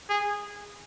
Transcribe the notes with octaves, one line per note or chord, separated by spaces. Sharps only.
G#4